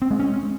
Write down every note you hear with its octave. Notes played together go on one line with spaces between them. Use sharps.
C4
G#3
C#4